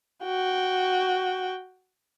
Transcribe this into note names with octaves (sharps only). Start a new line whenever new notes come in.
F#4 G5